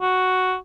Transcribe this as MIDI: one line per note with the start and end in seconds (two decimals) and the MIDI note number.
0.01 0.56 66